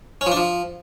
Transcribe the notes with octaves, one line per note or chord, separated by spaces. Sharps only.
C#4
F3
D4
F3